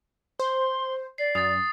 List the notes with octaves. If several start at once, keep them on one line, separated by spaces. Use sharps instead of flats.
C5 C6
D5 C7
F#2 D#6 A6